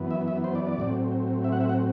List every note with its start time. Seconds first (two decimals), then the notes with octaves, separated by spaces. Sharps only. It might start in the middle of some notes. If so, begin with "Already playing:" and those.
Already playing: F#2 E3 B3
0.11 E5
0.28 E5
0.44 C5
0.55 D5
0.67 D5
0.78 A2 F#3 C4
1.44 E5
1.52 F#5
1.61 E5
1.69 F#5